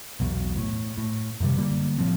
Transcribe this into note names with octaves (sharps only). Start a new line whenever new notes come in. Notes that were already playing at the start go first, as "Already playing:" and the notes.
B1 E2 B2
A2
A2
F#2 C3 D#3 G3
D3 G3 A#3
A2 F3 C4